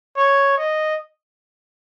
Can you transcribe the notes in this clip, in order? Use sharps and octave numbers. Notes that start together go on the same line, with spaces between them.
C#5
D#5